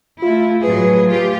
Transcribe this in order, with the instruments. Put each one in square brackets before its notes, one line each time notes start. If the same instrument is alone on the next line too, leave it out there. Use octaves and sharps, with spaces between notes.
[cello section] A3 E4 [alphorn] F4
[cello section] A2 F#3 G#4 [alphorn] B4
[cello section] F4 G4